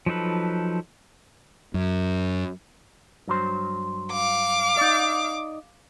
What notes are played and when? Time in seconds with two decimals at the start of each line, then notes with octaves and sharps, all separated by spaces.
0.06 F3 F#3 D#4 A4 B4
1.74 F#2
3.28 G2 F#3 C5
4.13 F5 D6
4.77 D#4 D5